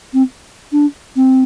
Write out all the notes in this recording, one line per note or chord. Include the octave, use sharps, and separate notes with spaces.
C4
D4
C4